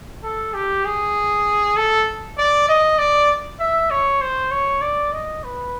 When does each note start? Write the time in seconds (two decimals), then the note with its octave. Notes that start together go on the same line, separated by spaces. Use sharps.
0.23 A4
0.54 G4
0.85 G#4
1.77 A4
2.38 D5
2.68 D#5
2.98 D5
3.60 E5
3.90 C#5
4.21 C5
4.51 C#5
4.82 D5
5.12 D#5
5.44 B4